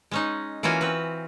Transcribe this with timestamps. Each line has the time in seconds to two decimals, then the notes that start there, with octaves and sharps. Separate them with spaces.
0.11 G#3 C#4 D#4
0.63 E3 A#3 C#4 F4 F#4 G#5
0.81 C4 B4